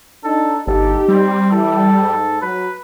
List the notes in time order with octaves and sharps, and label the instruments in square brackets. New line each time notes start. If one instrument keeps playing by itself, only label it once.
[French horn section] D4 D#4 [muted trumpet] A4
[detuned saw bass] G1 [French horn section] D#4 G4 [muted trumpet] A4
[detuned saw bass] G3 [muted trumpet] C4
[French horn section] E3 E4 [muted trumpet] A4
[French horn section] G#2
[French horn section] F#3 [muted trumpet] B4